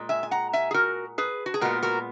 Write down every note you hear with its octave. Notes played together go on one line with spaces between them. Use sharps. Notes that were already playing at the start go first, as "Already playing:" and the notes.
Already playing: A#2 G#3
E5 G#5
G#5
F#5 A#5
E5 G#5
G#4
F#4 A#4
G#4 B4
F#4
G#4
A#2 G#3 B3 F#4 A#4
F#4 A#4